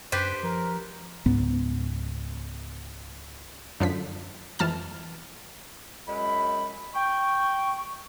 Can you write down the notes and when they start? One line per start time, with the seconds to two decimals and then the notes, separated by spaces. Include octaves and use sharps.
0.12 F#2 D4 G4 B4 C5
0.43 F3 A#4
1.26 C#2 G#2 B3
3.80 F#2 D3 F3 B6
4.59 F2 E3 A5 F6
6.07 F#2 G#3 B5
6.94 G5 C#6